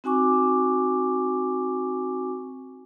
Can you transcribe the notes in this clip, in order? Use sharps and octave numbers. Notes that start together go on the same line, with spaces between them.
C4 D#4 F#4 G#5 C#6 D6